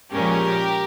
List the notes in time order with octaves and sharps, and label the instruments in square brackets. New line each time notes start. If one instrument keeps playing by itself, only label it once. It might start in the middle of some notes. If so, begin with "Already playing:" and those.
[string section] A#2 F3 G#3 C#4 G4 A#4